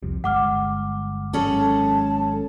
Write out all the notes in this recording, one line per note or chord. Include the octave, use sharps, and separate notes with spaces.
C2 F2 C3
G1 G#3 F#5 D6 F6
G#1 F#3 G#3 C#4 G#4 A4 A5